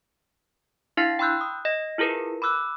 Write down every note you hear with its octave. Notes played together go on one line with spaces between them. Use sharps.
D4 E4 F5 C6 A6 C7
G5 B5 C6 E6 F#6 G6
D#6
D#5 A#6
E4 F4 G#4 A#4 B4
B5 D6 E6 F#6